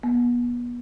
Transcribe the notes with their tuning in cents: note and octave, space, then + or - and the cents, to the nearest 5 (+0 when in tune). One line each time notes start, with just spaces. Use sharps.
B3 -35